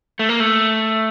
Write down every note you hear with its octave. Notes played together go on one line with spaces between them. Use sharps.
A3
A#3
A3